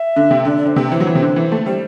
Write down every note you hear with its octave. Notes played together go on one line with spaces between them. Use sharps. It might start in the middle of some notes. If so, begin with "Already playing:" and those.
Already playing: E5
D3
C3
D3 D5
D5
D3 C5
C3 B4
E3 C5
F#3
E3
C3
D3
E3
A3
G3 C5